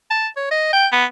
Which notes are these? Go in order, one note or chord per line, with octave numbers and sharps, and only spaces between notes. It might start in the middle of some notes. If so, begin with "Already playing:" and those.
A5
C#5
D#5
G5
B3